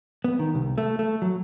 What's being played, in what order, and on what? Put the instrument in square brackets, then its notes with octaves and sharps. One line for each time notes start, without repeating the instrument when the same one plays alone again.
[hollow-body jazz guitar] B3
D#3
C2
A3
A3
F#3